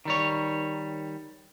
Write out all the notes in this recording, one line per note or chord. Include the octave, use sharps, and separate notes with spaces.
D#3 G3 C#5